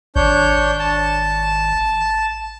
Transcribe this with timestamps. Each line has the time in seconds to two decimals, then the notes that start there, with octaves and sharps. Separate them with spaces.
0.16 G#1 D4 C#5 G6
0.79 A5